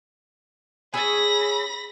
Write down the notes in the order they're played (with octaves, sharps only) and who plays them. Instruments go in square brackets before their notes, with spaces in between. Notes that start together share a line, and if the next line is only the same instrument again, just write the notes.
[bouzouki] G#4 C#5 E5 [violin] B5 A#6